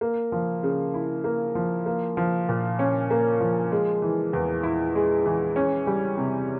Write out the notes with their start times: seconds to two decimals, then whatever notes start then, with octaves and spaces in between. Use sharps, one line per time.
0.01 A#3
0.32 F3
0.63 C#3
0.94 E4
1.24 A#3
1.55 F3
1.86 A#3
2.17 F3
2.49 A#2
2.79 C#4
3.10 A#3
3.41 F3
3.72 G#3
4.02 E3
4.33 E2
4.63 E4
4.95 G#3
5.26 E3
5.56 C#4
5.87 G3
6.18 C3